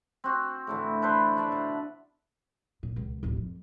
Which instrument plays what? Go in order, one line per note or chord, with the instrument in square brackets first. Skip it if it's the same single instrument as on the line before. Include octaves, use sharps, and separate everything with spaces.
[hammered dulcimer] C4 F#4
A2 D3 E3
A4 B4 C5 D5
D4 D5 E5
B2
[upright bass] A#2
C#2
D1 A1
F2